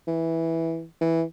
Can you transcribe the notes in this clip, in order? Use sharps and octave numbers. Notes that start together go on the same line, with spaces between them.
E3
E3